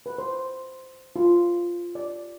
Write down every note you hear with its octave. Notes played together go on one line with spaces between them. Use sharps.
B4
C5
F4
D5